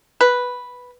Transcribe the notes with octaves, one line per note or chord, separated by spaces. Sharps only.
B4